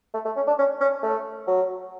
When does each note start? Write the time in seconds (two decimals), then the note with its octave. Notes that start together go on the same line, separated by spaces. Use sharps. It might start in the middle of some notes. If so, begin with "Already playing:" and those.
0.14 A3
0.25 A3
0.36 C#4
0.47 D4
0.58 C#4
0.81 C#4
1.03 A3
1.47 F#3